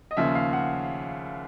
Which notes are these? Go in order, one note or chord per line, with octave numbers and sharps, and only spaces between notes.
D#5
D#2 C#3 F3 E5
F5
F#5